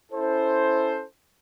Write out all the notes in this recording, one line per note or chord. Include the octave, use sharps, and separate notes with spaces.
C#4 E4 A4 C5